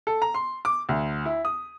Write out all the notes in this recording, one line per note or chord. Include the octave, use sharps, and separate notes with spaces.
A4
A#5
C6
D6
D2
E4
D#6